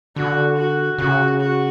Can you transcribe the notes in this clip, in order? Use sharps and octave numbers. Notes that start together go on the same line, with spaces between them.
D3 F#4
F#4
C#3 F#4
F#4